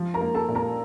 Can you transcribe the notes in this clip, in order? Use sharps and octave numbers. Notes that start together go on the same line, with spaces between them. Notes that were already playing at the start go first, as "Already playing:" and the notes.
Already playing: F3
A#4 A#5
A#3
A4 A5
A#2
A#4 A#5